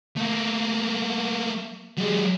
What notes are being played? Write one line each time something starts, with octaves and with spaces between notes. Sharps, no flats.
A3 A#3
F#3 G#3